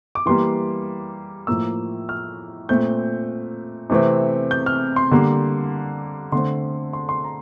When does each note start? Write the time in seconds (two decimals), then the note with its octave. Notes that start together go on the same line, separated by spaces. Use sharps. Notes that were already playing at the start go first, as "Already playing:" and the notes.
0.15 D6
0.26 E3 G3 A#3 C6
1.47 A2 F3 A#3 E6
2.09 F6
2.69 A#2 A3 C4 G6
3.90 C3 E3 A3 C4
4.51 G6
4.66 F6
4.96 C6
5.11 D3 G3 A#3
6.32 D3 A3 C4 C6
6.93 C6
7.09 C6
7.24 A#5